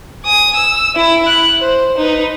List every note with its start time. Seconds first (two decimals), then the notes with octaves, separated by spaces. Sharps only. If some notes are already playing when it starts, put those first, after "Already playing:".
0.24 G#5 D#6
0.56 E6
0.95 E4
1.27 F#6
1.60 C5
1.98 D#4 B4